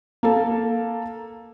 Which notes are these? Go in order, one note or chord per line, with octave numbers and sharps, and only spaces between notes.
A#3 A4